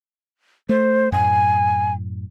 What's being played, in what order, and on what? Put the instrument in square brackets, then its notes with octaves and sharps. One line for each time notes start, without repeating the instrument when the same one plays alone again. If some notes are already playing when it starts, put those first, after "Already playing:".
[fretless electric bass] A3 [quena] C5
[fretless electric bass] F#2 A2 [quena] G#5